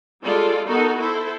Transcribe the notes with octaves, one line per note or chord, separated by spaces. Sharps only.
G3 G#3 F4 A4 D5
B3 D#4 F#4 A4 A#4
E4 A4 C5